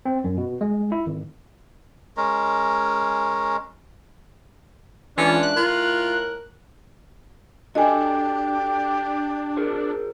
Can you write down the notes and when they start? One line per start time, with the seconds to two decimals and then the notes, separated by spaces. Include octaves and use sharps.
0.05 C4
0.24 F#2
0.37 B2
0.61 G#3
0.92 E4
1.06 G#1
2.17 G#3 C#4 A#4
5.17 G#2 E3 A3 C#4 D4 F4
5.43 F#6
5.57 A2 F4 A#4
7.75 D4 F#4 G4 A4 D#5 G#5 A5
9.57 G#4 A#4 C5